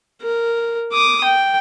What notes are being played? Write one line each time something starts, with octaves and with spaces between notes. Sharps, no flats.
A#4
D6 D#6
G5